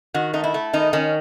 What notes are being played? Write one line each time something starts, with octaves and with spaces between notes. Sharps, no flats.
D#3 F#4
A3 D#4
E4
A3
D#3 D#4
D#3 C#4